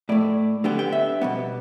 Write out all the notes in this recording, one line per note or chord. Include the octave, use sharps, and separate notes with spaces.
A2 A3 D5
D3 G3 B3 G5
G5
E5
B2 G3 B3